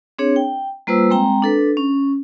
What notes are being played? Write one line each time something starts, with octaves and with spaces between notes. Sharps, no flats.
C4 D4 G#4 C#5
G5
G3 A#3 F4 B4 C5 E6
G#3 C4 G5 A#5
D4 A4 B4
C#4